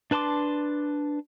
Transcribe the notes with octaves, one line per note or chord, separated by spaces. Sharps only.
D4 B4 A5 C6 D6